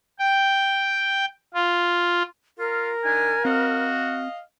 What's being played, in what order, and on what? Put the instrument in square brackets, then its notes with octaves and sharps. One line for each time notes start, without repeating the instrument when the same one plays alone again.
[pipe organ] G5
F4
[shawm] F4 [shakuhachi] A#4
[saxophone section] D#3 D4 D#4 [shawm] G#5
[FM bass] C4 [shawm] F#4 [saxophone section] D#5 F5